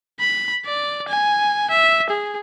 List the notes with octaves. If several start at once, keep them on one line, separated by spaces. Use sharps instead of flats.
B5
D5
G#5
E5
G#4